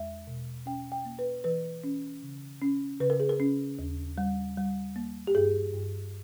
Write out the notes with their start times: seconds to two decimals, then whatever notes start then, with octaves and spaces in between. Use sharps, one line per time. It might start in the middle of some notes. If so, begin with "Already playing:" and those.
Already playing: E2 G#3 E5
0.27 B2
0.66 C#4 G5
0.92 G5
1.05 A#3
1.19 B4
1.44 E3 B4
1.84 C#4
2.23 C#3
2.62 C#4
3.00 C#3 B4
3.10 A#4
3.20 G#4
3.29 A#4
3.40 C#4
3.79 D#2
4.18 G3
4.57 G3
4.96 A#3
5.27 G4
5.35 G2 G#4
5.74 G2